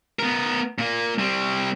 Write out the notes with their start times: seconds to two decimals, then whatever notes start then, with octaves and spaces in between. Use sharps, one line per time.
0.19 B3 A#4
0.79 A#2 A#3
1.19 G3 C4